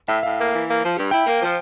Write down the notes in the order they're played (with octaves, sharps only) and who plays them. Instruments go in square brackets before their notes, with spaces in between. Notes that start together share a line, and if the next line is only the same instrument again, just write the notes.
[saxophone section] A2 [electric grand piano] E5
[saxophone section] A2 [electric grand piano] F5
[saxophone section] A#3
E3
A#3
F3
G2
[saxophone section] E4 [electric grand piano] G5
[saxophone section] A#3
F3